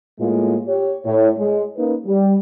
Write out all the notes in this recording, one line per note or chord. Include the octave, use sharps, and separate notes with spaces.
A2 G#3 A#3 F4
G4 C#5
A2 C#5
G#3
A#3 C#4 D#4 B4
G3